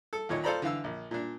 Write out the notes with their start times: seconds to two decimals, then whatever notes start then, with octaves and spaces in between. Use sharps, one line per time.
0.13 A4
0.29 D#2 A#2 C#5 D#5
0.44 F4 A4 C5 D5 A#5 B5
0.62 D3 E3 F5 E6
0.84 A#1
1.11 A#2 D4